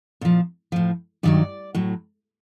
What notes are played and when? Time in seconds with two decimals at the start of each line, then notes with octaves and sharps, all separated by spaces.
0.21 A#2 F3
0.72 A2 F3
1.23 G2 D#3 F#3 D5
1.75 A2 F#3